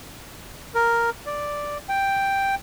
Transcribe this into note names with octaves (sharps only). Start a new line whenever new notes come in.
A#4
D5
G5